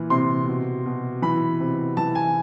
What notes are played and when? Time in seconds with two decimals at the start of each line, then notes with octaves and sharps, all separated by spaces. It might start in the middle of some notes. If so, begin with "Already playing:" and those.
Already playing: A#2 E3
0.10 C3 C6
0.48 B2
0.86 B2
1.22 E3 B5
1.60 C3
1.97 E3 A5
2.15 G#5